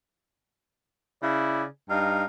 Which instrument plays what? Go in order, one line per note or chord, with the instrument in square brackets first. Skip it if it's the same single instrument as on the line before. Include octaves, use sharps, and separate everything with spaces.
[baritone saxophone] C#3 [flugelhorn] E4 [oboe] D5
[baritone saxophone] G2 [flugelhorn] D#4 [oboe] F5